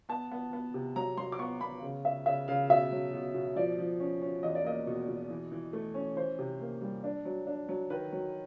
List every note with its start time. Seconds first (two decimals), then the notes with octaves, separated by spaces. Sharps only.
0.09 B3 A5
0.31 B3
0.53 B3
0.74 C3
0.96 F#3 A#5
1.17 F#3 C6
1.32 D6
1.39 B3 C#6
1.61 B3 B5
1.83 C#3
2.05 C#3 E5
2.26 C#3 E5
2.48 C#3 F5
2.69 B2 E5
2.92 F#3
3.14 B2
3.34 B2
3.56 F3 D5
3.78 F3
4.00 C#4
4.22 C#4
4.43 E2 D#5
4.55 D5
4.64 A#3 D#5
4.87 B2
5.08 B2
5.30 E3
5.52 E3
5.73 A3
5.94 C#4
6.16 E3 C5
6.39 C3
6.61 A#3
6.82 G3
7.04 D4
7.25 F#3
7.47 D4
7.69 F#3
7.90 D#3 B4
8.12 F#3